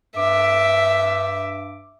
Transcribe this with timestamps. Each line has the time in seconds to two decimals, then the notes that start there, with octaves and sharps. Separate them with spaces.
0.16 G2 E5 D6